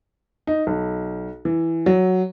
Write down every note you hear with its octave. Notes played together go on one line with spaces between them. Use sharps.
D#4
B1
E3
F#3